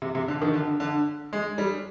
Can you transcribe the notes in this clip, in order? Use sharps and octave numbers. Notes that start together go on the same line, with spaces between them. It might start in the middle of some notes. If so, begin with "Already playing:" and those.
C3
C3
D3
D#3
D3
D3
G#3
G3